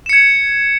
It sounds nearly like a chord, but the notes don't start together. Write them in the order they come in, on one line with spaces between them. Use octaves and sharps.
E7 C#7 G#6